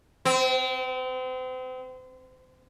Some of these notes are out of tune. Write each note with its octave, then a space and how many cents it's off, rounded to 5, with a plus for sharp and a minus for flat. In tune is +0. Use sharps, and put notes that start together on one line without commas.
C4 -35